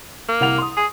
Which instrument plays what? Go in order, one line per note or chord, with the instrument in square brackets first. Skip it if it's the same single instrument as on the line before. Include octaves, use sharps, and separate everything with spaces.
[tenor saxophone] A#3
[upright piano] C2 F#5 F7
C6 D#6
[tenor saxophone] G#4